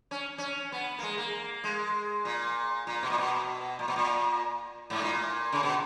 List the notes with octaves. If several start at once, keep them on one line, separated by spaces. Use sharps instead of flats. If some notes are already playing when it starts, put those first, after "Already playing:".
C#4
C#4
B3
A#3
G#3
A#3
G#3
A#2
A#2
B2
A#2
B2
A#2
B2
A#2
G#2
A#2
C#3
B2